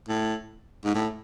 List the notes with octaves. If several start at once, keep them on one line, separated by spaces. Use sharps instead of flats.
A2
G#2
A2